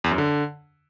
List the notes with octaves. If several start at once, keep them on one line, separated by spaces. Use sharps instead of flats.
E2
F#2
D3